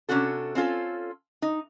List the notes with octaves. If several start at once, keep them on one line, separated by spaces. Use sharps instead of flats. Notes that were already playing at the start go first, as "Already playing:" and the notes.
C3 C#4 D4 F#4 A4
C4 C#4 F4 A4
D#4